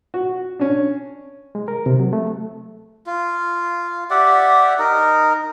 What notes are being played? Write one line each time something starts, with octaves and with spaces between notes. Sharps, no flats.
F#4
C#4 D4
G#3
A#4
C3
F#3
A3
F4
G4 D5 E5 F#5
D#4 A#4